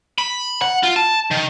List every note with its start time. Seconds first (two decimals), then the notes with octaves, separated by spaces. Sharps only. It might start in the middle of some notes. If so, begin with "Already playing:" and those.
0.18 B5
0.62 F#5
0.83 F4
0.96 A5
1.31 D#3